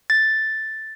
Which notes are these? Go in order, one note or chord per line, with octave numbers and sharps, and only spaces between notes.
A6